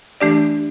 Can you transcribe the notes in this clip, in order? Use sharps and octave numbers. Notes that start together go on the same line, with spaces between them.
E3 A3 D4 G4 D5